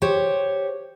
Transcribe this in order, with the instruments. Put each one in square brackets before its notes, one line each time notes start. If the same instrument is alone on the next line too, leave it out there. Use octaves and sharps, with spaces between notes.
[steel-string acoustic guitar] G4 C5 C#5